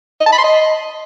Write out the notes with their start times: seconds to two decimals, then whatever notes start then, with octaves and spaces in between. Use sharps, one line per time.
0.20 D#5
0.26 A5
0.32 B5
0.38 C6
0.44 D#5